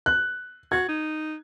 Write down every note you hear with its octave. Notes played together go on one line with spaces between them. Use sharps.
F#6
F#4 G#6
D#4